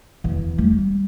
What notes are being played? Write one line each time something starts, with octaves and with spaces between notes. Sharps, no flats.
E2
G3